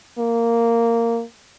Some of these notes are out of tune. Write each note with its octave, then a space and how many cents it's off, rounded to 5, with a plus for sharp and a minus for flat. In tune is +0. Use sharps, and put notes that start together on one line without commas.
A#3 -10